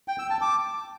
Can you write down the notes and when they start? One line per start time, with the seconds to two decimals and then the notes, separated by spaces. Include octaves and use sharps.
0.08 G5
0.19 E6
0.30 A5
0.41 D6